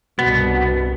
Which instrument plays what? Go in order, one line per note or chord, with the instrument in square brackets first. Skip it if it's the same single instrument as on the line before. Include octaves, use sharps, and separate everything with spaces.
[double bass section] C2 G2 [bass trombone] B2 [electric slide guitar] B3